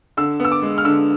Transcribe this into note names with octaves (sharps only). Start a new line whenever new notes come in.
D3 E6
B3 E6
D6
G#3
F6
D3 E6